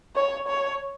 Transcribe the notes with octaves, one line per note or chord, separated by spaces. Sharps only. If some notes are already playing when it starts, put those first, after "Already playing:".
C#5
C#5